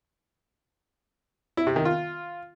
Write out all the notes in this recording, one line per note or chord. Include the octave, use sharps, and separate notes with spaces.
E4
C3
D#3
F4